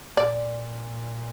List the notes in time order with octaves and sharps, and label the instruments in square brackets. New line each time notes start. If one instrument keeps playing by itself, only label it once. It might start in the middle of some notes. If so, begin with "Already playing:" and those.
[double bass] A#2 [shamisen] D5